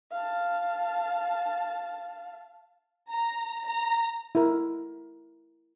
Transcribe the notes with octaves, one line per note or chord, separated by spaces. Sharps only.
F5 A5
A#5
A#5
E4 A#4